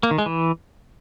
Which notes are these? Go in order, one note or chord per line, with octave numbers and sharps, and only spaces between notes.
A#3
D#3
G#3
E3